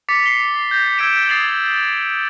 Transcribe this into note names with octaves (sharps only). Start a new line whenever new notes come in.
D6 A6 B6 C#7
C7 G7
G6 A6 A#6
E6 G#6 B6 D7 E7
D#6 A6 C7 F7 F#7